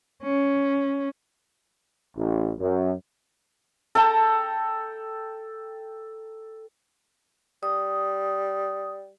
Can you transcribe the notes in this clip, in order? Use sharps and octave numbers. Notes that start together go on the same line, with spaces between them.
C#4
A1
F#2
A4 G5 A5 A#5
G3 D#6